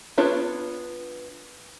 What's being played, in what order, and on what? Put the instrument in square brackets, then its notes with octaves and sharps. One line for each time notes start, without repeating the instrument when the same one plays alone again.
[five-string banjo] B3 D4 F4 C#5